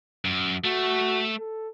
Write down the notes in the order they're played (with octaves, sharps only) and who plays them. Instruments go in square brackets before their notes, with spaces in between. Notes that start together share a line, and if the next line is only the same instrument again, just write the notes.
[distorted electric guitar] F#2
[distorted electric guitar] A3 [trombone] F#4
[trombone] A4